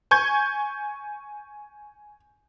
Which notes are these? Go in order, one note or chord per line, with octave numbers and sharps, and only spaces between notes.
G#5 C#6 G6 G#6